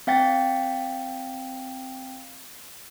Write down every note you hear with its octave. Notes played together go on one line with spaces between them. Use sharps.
C4 F5 G5 A6